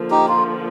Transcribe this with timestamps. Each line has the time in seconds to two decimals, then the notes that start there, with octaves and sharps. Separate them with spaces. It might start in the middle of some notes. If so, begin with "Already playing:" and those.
Already playing: D3 F3 A#3
0.11 D#4 G4
0.28 F4